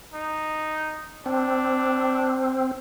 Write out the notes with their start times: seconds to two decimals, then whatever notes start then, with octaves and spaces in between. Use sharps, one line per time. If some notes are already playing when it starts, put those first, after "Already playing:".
0.14 D#4
1.26 C4 D4